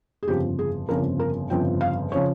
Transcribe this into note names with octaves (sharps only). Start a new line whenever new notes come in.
G#4
G1 F2 C#3 F3 G4
G#4
G1 F2 C#3 F3 A#4
A#4
G1 F2 C#3 F3 G5
F5
C#3 F3 C#5